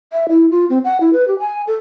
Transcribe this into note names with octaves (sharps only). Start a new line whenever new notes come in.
E5
E4
F4
C4
F#5
E4
B4
G4
G#5
A4